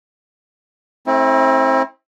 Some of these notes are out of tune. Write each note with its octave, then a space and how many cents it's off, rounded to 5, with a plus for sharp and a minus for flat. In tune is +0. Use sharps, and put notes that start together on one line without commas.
A3 +0 C4 +25 E4 -35